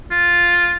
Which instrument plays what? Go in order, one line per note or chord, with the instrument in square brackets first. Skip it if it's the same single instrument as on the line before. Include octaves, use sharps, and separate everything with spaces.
[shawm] F4